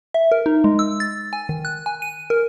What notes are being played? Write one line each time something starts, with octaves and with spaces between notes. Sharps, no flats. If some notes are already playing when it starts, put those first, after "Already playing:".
E5
A#4
D#4
G#3
E6
A6
G#5
D#3
F#6
G#5
D#7
A#4